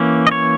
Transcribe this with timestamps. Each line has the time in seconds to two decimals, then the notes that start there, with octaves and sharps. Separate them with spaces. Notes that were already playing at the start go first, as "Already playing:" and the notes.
Already playing: E3 A#3 C#4
0.27 D#5
0.31 C#5